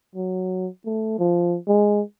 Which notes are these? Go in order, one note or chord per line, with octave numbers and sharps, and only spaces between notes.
F#3
A3
F3
G#3